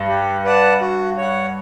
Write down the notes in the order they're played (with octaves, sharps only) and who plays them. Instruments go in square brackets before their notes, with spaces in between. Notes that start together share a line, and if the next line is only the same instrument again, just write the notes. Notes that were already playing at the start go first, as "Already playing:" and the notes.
Already playing: [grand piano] G2
[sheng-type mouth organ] G4
B4 D5 F#5 A5
F#4
C#5 F#5